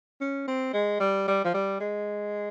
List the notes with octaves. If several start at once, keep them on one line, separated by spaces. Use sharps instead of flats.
C#4
C4
G#3
G3
G3
F3
G3
G#3